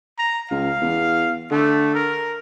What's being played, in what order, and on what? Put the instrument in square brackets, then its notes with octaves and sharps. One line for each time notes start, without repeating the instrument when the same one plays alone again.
[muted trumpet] A#5
[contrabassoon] C#2 [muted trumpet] F5
[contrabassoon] E2
[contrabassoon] D3 [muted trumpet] A3
[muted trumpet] A#4